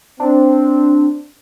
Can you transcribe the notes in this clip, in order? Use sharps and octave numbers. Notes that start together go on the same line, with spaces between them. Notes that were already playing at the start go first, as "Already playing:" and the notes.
C4 D4